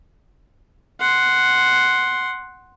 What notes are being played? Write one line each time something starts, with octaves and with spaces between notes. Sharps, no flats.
F#5 C6